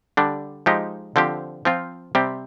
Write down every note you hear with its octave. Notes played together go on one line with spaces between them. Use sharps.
D3 G3 D4
F3 G#3 D#4 G4
D3 F3 C4 G4
F3 C4 F4
C3 G3 C4 G4